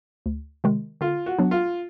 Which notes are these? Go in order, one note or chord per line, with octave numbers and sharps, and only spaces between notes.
D2
C3 D#3 G#3
D3 F4
F#4
F#3 B3 D4
F4